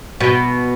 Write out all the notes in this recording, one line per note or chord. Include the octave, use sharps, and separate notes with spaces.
B2